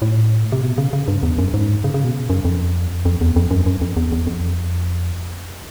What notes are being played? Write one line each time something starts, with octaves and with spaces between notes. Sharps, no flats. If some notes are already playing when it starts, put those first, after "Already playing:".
A2
C3
B2
C#3
C#3
G2
E2
F#2
G#2
C#3
C#3
B2
F#2
F2
F2
E2
F2
F#2
F#2
F2
E2
E2
F2